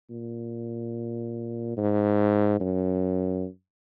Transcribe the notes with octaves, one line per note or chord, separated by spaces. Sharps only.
A#2
G#2
F#2